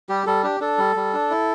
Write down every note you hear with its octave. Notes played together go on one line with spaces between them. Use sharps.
G3 G4
G3 A4
D4 G4
D4 A4
G3
G3
D4
E4